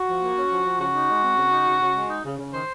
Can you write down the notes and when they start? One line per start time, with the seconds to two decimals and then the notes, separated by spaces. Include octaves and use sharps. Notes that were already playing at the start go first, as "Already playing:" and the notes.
Already playing: F#4
0.09 F3
0.22 A#3
0.37 C#4
0.51 F3
0.65 F3
0.80 C#3 F#4
0.95 D#4
1.09 G#3
1.24 C4
1.38 C#3
1.52 D#4
1.67 C#3
1.82 C#3
1.96 G#3
2.10 D#4
2.25 C#3
2.39 C#3
2.53 D#3 C5